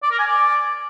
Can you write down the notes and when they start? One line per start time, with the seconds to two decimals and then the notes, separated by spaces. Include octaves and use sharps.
0.03 D5
0.11 A#4
0.19 G#5
0.27 D5